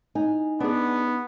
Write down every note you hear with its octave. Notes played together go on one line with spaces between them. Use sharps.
D#4 G#5
B3 D4 G#4